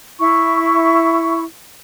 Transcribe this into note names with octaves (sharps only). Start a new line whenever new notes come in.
E4 C#6